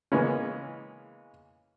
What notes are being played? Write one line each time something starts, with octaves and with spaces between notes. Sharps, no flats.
C#3 E3 G#3 A#3 B3 C#4